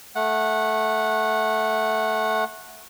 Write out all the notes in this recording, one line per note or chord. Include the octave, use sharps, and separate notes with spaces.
A3 F#5